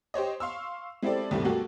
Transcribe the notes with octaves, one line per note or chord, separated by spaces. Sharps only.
G4 C5 C#5 D#5
F5 C6 C#6 E6
G#3 C4 E4 G4 A4 D5
D#2 G#2 C3 G3 A3
F#3 G#3 A#3 F#4 G4 A4